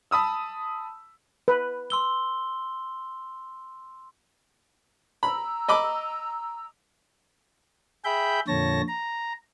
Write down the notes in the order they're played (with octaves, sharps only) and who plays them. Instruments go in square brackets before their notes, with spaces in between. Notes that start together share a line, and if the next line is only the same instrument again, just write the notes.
[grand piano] A5 B5 D#6 E6
[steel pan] B4
[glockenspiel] C6 E6 G7
[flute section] A#5 E6 [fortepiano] B5
[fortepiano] D#5 B5 D6
[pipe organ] G#4 E5 G5 B5 G6
F2 A#2 D3 C#5 A5 A#6
A#5